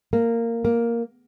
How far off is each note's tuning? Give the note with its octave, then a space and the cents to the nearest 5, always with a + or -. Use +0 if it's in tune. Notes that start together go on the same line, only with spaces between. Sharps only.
A#3 -15
A#3 +0